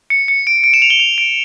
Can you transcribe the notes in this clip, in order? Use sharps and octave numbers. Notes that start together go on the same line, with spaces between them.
C#7
C#7
D7
D7
E7
F7
G7
F7
D7